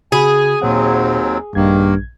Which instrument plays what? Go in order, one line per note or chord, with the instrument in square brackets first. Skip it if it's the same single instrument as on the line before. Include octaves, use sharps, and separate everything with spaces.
[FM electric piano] C#3 F#4 B5 [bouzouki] G#4 [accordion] G#5
[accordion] D#2 F#3 C4 [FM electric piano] A#2 C5 F#5
[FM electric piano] A#1 G#6 [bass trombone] G2 [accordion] D#3 A#3